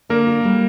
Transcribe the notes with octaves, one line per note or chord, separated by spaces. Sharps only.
D3 A#3 A#4
F4
G3